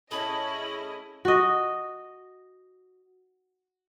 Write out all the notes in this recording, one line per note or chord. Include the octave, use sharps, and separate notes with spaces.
A2 C#4 E4 G#4 D#5 B5
F#4 D#5